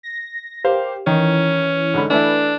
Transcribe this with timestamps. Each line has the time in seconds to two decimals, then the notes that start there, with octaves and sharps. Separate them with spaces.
0.03 A#6
0.64 G4 A#4 C5 F5
1.07 D#3 E3 C#4
1.94 G#2 D3 B5
2.10 E3 A3 D4 E4 B4